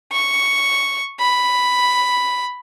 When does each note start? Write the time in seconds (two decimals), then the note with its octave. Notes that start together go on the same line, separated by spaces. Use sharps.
0.12 C#6
1.20 B5